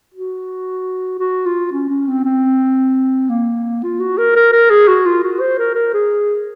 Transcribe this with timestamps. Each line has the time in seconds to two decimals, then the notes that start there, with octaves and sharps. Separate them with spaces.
0.14 F#4
1.19 F#4
1.46 F4
1.73 C#4
1.90 C#4
2.08 C4
2.25 C4
3.30 A#3
3.83 F4
4.00 F#4
4.18 A#4
4.36 A#4
4.52 A#4
4.70 G#4
4.88 F#4
5.06 F4
5.23 F#4
5.40 C5
5.59 A#4
5.75 A#4
5.94 G#4